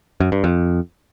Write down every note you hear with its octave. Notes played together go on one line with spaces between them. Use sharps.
F#2
G2
F2